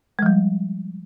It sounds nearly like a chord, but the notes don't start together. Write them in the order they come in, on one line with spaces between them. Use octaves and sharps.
G#3 F3 G3